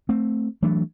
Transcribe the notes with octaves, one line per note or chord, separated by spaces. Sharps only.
A3 C4
E3 F#3 A3 D4